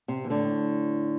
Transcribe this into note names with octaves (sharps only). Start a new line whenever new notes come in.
C3
E3
A2 D3